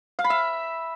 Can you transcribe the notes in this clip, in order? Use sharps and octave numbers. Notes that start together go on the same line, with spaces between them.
F5
B5
E5